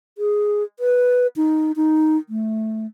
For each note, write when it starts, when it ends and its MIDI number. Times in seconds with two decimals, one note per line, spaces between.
0.18 0.63 68
0.79 1.27 71
1.36 1.72 63
1.76 2.17 63
2.29 2.86 57